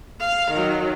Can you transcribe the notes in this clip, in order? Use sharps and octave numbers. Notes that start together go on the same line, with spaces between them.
F5
D#3 F#3